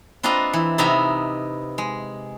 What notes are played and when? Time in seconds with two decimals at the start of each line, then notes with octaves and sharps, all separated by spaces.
0.23 C4 D4 F4 B4 D#5 A#5
0.53 E3
0.78 C3 B3 D#4 E5 A#5 B5
1.78 G#3